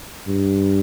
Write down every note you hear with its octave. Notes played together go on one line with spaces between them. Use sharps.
G2